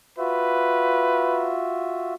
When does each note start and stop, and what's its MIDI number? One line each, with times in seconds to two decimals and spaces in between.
0.18 2.14 65
0.18 2.14 66
0.18 1.54 71
0.18 2.14 76